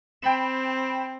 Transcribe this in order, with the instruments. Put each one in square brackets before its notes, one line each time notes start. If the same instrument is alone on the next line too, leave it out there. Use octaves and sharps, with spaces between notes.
[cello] C4 [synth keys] G5 B5 E7